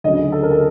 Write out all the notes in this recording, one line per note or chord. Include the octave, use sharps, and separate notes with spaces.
D2 C#3 F#3 D#5
A4
A#4
A4